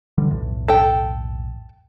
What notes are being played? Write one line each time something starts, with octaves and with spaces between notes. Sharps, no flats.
D3 E3 G3
B1 E2 A2
A4 G5